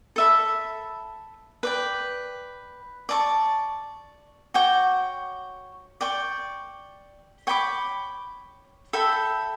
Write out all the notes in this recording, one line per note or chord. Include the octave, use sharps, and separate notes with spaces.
A4 E5 B5
B4 D5 G5
D5 A5 C#6
F#4 C#5 G5 D6
D5 G5 C#6
C#5 G5 B5 D6
A4 E5 G5 B5